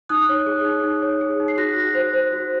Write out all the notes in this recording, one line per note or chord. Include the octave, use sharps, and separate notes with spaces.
D#4 D#6 F#6
C#5
G#4
D#4
D#4
C#5
G#4
D#4
C7
F#4 F#6 A#6
F#4
C5
C5
F#4